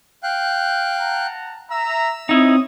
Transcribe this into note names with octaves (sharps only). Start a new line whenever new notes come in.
F5 G5 F#6
F#5 A5 A#5
E5 A#5 E6
C4 D#4 E4 C#5 D#6